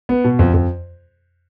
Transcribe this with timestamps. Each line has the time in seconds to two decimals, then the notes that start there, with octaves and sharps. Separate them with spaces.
0.09 B3
0.24 B2
0.39 F2
0.54 F2